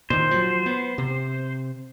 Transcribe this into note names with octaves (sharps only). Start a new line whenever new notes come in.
A#2 D#3 C5
F3 F#3
B3
C3